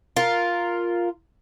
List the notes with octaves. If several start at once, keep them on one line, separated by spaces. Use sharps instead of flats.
F4 A#4